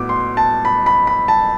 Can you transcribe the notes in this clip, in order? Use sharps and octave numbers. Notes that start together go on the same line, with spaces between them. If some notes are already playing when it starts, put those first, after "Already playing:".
Already playing: A2 F#3 B3 D6
C6
A5
B5
B5
B5
A5